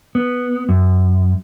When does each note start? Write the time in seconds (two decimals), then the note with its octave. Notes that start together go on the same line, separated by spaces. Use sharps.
0.15 B3
0.69 F#2